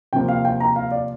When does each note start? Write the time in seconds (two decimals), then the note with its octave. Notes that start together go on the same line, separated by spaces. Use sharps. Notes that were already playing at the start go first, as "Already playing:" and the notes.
0.13 C3 F3 A#3 G5
0.28 F5
0.45 G5
0.60 A#5
0.76 F5
0.91 D5